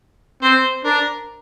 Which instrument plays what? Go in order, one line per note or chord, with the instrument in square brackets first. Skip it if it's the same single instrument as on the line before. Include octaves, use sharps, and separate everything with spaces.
[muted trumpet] C4 [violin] C5
[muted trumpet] D4 [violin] A#4